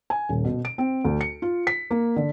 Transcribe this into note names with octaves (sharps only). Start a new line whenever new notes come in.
G#5
D#1
B2
D7
C4
D2
C#7
F4
B6
A#3
D3